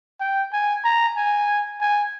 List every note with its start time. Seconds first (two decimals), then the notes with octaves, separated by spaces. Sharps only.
0.20 G5
0.53 G#5
0.85 A#5
1.17 G#5
1.81 G#5